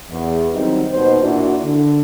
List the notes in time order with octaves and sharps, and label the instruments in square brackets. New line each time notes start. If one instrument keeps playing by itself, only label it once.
[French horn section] E2
D#3 F#3 G3 C4 D#4
D#2 B2 D#3 C5
A#2 D4 E4 F#4
D3